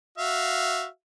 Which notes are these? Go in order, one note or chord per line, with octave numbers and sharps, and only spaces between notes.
F#4 E5 F5